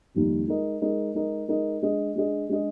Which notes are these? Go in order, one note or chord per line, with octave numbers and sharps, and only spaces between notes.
F2 D#3 G3 A#3 D#4
G#3 D#4 A#4 D#5
G#3 D#4 A#4 D#5
G#3 D#4 A#4 D#5
G#3 D#4 A#4 D#5
G#3 D4 G#4 D#5
G#3 D4 G#4 D#5
G#3 D4 G#4 D#5